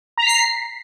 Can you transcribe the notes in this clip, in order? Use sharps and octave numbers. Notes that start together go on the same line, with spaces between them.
A#5 B6 C7